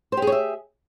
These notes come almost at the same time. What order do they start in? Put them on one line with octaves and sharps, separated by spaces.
C5 G4 G#4 C#5 E5